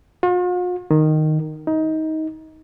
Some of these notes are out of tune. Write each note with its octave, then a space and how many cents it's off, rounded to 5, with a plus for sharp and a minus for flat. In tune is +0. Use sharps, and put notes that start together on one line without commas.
F4 +45
D#3 -10
D#4 +20